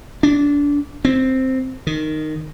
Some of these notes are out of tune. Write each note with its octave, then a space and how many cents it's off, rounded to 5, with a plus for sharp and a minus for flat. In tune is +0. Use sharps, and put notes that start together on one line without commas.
D4 -25
C4 +0
D#3 -10